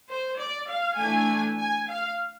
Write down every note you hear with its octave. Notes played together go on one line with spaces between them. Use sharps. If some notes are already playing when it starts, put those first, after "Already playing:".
C5
D5
F5
E3 A3 D4 G#5
G#5
F5